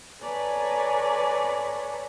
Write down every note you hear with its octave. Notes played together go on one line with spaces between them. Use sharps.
A4 B4 C#5 D5 G#5 A#5